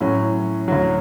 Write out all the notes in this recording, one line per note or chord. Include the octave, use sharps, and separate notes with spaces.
A2 F#3 C#4
D2 D3 F#3